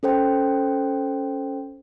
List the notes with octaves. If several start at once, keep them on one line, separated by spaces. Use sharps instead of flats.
C#4 A4 C5 G5